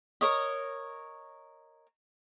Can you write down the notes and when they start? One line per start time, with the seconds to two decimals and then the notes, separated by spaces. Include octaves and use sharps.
0.21 A#4 C#5 D#5